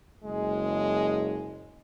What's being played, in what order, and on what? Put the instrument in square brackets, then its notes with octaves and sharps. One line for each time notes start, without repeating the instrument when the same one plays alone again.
[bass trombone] F#1 [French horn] G#3